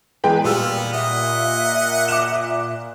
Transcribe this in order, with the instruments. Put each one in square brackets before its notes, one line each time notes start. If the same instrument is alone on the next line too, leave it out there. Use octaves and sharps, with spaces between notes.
[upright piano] E2 G#3 G5 [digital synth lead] B4
[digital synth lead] A#2 [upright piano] G3 F4 E6 [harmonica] B3
[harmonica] D#5 F#5 [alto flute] E5
[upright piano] D6 F#6 E7